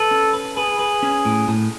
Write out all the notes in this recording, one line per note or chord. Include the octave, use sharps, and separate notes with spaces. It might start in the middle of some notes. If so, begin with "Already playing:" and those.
Already playing: A4 B4
C#4
B4
G#4 B4
B4
C#4
A2
A2